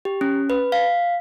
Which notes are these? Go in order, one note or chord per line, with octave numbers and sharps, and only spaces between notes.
G4
C#4
B4
F5